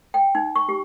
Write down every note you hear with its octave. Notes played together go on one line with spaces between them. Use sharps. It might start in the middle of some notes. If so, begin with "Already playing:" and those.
G5
D#4
C#6
G4